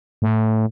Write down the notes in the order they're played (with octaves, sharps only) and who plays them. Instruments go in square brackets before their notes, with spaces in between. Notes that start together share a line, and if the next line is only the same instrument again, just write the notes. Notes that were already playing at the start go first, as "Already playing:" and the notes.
[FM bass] A2